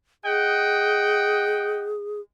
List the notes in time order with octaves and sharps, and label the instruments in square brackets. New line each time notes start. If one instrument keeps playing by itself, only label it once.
[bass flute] G#4 [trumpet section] D#5 F#5 G5